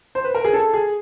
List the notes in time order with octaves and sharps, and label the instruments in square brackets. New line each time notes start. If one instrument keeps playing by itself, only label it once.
[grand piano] C5
B4
A#4
G#4
A4
G#4